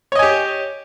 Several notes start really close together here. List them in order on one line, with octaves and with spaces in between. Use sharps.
C#5 D#5 G#5 G4